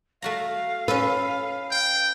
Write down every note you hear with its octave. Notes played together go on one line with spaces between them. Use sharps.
A3 F#4 F5 A#5
C#4 A4 B4
G5